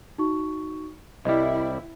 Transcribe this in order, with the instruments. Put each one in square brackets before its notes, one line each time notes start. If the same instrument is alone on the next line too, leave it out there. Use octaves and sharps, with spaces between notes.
[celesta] D#4 F#4 C#6
[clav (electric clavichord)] C2 G3 [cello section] E4 [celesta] D#5